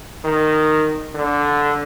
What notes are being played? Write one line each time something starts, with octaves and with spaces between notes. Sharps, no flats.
D#3
D3